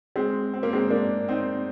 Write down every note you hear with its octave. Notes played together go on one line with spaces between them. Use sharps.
G#3 C4
C4
A#3
G#3 C4
A#3 D4
C4 D#4